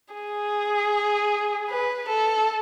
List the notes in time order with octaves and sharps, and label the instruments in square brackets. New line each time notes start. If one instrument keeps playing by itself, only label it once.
[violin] G#4
B4
A4